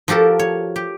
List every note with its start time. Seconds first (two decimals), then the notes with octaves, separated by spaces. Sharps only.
0.08 F3 F#4 G4 A4 A#4
0.39 C#5
0.76 G4